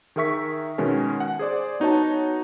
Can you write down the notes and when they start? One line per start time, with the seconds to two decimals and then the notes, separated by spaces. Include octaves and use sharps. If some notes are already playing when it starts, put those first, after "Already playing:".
0.16 D#3 G#4 A#4 E5 C#6 B6
0.78 B2 D#3 G#3 C#4
1.20 F#5
1.39 G#4 C5 D5
1.80 B3 D#4 F#4 C#5 A5